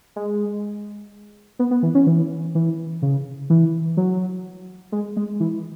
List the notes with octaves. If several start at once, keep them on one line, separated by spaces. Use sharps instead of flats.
G#3
B3
B3
E3
C#4
E3
E3
C#3
E3
F#3
G#3
G#3
E3